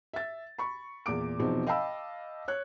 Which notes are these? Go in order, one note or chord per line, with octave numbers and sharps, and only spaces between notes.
E5 A6
B5 C#6
E2 A#2 D6 D7
E2 B2 F3 C4 D#4
D#5 F5 G5 A5 B5 E6
C#5 F#6